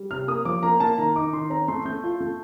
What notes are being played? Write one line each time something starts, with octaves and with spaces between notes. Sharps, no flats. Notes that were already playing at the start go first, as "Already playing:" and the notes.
Already playing: G3
C3 F6
A#3 D#6
F3 D6
A#3 A#5
A#3 A5
D#3 A#5
D#4 D6
D#3 C6
C4 A#5
A3 C6
A3 G6
F4
A3